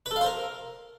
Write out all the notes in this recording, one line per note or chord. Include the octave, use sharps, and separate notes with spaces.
B4
A4
F5
C5
A#4